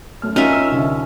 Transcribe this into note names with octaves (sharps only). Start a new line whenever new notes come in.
F#2 A3 F6
C#4 D#4 F4 A#4 E5
E6 F6
C2 D3